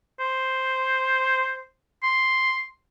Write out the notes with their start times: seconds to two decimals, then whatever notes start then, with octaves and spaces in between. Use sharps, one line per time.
0.20 C5
2.03 C6